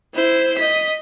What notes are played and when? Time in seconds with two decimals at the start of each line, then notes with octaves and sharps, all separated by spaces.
0.14 E4 C5
0.58 D#5 B6